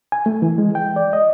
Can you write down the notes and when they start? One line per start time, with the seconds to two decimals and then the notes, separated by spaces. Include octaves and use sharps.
0.12 G#5
0.26 A3
0.42 E3
0.58 G#3
0.75 G5
0.96 D5
1.13 D#5